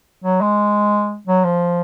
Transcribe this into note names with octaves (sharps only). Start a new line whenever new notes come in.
F#3
G#3
F#3
F3